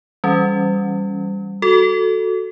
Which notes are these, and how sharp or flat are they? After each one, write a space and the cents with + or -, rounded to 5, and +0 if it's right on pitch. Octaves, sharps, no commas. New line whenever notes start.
E3 +0 G3 +0 C#4 +0
F#4 -5 A4 +0